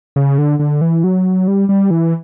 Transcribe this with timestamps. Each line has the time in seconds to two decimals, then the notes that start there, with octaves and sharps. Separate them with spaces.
0.16 C#3
0.38 D3
0.59 D3
0.81 E3
1.04 F#3
1.48 G3
1.69 G3
1.91 E3